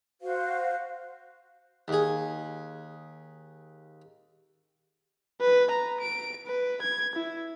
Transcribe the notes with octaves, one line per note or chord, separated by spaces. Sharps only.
F#4 C5 F5
D#2 G#4
B4
A#5
D7
B4
G#6
E4